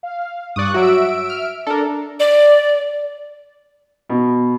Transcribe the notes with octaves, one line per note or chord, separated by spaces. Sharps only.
F5
G2 D5 C#6 D#6 F#6
F#3 F#4 E5 E6 D7
F6
D4 A4 A#4
D5
B2